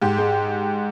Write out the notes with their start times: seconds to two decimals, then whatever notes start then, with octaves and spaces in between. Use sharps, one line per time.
0.02 G#2 G4
0.18 G#3